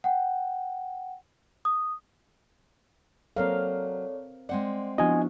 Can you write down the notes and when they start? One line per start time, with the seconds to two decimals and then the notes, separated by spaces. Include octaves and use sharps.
0.04 F#5 G5
1.65 D#6
3.36 F#3 A#3 C4 A4 A#4 C#5 D5 F5
4.49 G#3 C4 D5 F#5
4.98 F3 B3 D4 E4 F#4 D#5 G#5